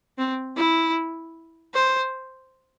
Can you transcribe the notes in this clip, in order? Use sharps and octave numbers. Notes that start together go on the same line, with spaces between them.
C4
E4
C5